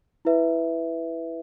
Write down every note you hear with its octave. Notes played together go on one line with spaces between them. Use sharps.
E4 B4 E5